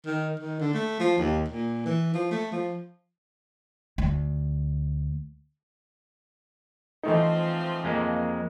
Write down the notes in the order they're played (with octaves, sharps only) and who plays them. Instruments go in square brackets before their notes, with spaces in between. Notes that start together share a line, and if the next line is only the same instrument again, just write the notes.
[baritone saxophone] D#3
D#3
D3
A3
F3
D#2
A#2
E3
F3
A3
F3
[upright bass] D2
[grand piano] E3 A3 D#4 [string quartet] F3 C4 F4
[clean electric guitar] F2 G#3 A#3